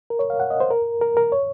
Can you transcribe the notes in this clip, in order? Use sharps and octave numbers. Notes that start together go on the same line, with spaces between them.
A#4
C#5
F5
F#5
D#5
C5
A#4
A#4
A#4
C#5